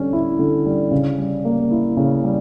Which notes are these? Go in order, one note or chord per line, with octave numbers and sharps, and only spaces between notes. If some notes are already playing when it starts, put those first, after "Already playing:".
Already playing: D3 G3 C#4
E4
D3
G3
C#3
G3
A#3
E4
C#3
G3